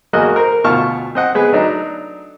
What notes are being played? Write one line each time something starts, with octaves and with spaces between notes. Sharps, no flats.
E2 G#3 A#3 F#4 D#5 F#6
A#4 C5
D2 B2 F4 A5 C#6 F6
C4 D#5 F#5
G#3 B3 G#4 B4
F#3 A3 D4 D#4